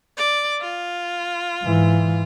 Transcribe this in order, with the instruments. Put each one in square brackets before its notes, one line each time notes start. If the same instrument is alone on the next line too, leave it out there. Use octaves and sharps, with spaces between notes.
[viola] D5
F4
[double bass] G#2 E3